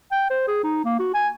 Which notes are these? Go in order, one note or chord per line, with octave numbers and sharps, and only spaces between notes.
G5
C5
G#4
D#4
A#3
F#4
G#5